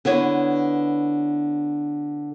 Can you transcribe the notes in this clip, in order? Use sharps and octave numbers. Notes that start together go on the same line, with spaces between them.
D3 B3 E4 C#5